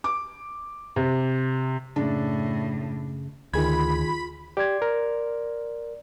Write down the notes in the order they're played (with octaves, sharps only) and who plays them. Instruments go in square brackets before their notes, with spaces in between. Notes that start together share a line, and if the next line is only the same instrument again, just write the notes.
[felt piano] D6
C3
[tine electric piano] F#2 C#3 [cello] A2 [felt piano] D4
[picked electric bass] D2 [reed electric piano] D#3 G#4 G#6 [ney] F4 [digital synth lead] B5
[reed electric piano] G4 [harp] D5 C6 G#6
[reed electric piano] A#4